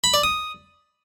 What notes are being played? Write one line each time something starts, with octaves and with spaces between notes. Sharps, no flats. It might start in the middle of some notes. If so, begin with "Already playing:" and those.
B5
D5
D#6